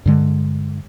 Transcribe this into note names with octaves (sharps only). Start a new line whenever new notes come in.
G2 D3 G#3